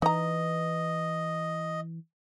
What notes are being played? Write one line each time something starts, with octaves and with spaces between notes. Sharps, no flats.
E3 D#4 D#5 A#5